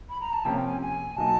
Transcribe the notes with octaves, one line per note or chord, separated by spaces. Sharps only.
B5
A#5
A5
C3 F3 A#3 C#4 G5
G5
G#5
G#5
B2 F#3 A#3 D#4 A5